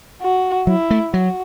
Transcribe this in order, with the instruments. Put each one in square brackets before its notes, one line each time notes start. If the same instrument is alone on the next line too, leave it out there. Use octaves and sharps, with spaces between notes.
[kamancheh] F#4
[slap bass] F#3 [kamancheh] E4
[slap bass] A3
[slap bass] F#3 [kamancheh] F#4